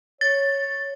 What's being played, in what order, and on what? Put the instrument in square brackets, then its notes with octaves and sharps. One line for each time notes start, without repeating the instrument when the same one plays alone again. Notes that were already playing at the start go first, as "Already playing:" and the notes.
[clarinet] C#5 [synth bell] A6